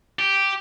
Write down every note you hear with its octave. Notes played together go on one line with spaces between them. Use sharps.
G4